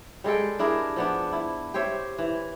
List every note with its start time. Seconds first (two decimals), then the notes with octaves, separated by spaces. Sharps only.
0.24 G3 G#3 A4 G5
0.59 D4 E4 G#4 A#4
0.96 F3 B3 D4
1.32 E4
1.74 G4 C5 C#5 E5
2.18 E3